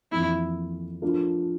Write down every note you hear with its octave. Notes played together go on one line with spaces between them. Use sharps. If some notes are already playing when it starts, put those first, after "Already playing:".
F2 E3 A#3 E4
F3 A3 D4 F4 A#4